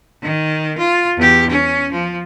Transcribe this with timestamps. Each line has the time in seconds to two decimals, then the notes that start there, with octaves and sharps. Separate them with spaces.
0.23 D#3
0.78 F4
1.18 E2 G4
1.50 C#4
1.92 F3